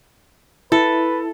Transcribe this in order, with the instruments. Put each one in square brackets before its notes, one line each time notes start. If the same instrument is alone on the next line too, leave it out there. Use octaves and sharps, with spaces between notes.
[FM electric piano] E4 [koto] A4 [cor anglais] B4